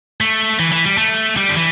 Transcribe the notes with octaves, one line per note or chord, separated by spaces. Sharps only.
A3
E3
E3
G3
A3
G3
D3
E3